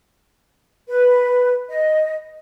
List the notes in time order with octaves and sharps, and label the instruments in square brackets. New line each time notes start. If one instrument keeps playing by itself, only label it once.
[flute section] B4
D#5